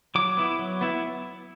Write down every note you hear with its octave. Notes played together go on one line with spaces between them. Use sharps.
F#3 D6
B3 E4
F#3
B3 E4